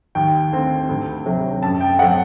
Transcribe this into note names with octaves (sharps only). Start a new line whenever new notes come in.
D#2 G5
D3 A3 C4
D2
C3 F#3 A3
F#2 A5
G5
F#3 A3 C4 F#5